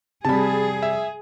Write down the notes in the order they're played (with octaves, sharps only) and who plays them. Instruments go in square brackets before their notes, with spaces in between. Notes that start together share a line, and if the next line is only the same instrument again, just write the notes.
[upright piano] C3 G3 [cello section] G#4 [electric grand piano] A5 B5
[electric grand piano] E5